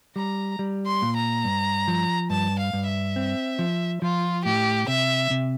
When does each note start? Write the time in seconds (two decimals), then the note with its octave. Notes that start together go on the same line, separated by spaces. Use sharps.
0.16 G3 A#5
0.59 G3
0.87 C6
1.02 A#2
1.16 A#5
1.45 G2
1.88 F3
2.30 G2 A5
2.59 F5
2.73 G2
2.87 E5
3.16 C4
3.59 F3
4.02 F3 F4
4.45 A2 G4
4.88 C3 E5
5.31 C3